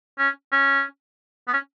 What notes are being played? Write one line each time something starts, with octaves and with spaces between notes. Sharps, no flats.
C#4
C#4
B3
C#4